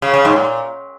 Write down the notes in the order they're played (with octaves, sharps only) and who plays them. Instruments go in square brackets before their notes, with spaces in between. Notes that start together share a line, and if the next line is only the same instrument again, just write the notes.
[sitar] C#3
C#3
G#2
A#2